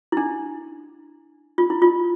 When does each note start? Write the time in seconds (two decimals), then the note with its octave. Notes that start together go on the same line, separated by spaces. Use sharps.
0.12 E4
0.17 D4
1.58 F4
1.70 E4
1.82 F4